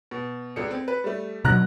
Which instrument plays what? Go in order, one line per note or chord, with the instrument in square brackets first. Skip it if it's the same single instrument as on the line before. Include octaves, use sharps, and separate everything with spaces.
[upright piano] B2
C#2 D3 C#7
C4
B4
G3 A3
[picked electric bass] B2 D3 F#3 [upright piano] A#5 F#6 A#6